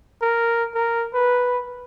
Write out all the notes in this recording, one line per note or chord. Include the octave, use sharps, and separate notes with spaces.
A#4
A#4
B4